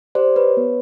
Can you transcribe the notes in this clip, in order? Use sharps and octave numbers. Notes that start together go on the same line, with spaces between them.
G4 C5 D5
B4 C#5
B3